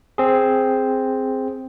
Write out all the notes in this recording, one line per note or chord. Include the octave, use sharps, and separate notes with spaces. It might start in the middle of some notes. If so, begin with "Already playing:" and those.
C4 G#4